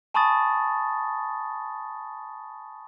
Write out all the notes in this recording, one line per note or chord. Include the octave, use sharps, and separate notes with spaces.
G#5 A5 B5 C#6 D#6 A6